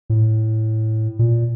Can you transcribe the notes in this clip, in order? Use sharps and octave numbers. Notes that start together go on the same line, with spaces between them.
A2
A#2